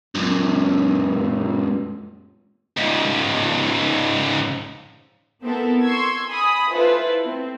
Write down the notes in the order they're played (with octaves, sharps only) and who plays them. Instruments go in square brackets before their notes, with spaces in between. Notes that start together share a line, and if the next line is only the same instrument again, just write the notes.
[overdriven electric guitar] C#2 F#2
[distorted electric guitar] C#2 G#2
[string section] B3 C4 E4 A4 A#4
C6 C#6 E6 G#6
G#5 B5 D#6
E4 F4 A4 B4 C5
C4